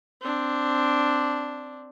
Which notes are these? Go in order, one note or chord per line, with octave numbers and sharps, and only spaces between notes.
C4 D4